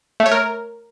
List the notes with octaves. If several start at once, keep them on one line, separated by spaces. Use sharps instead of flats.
A3
C#5
A#4